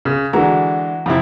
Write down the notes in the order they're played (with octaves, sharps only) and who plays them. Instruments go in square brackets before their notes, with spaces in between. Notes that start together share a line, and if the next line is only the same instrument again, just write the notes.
[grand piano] C#3
[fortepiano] D3 G#3 [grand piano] E3 F#4 A#5
[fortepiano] F2 C3 E4